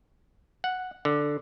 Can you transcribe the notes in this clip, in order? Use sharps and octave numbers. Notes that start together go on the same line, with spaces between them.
F#5
D3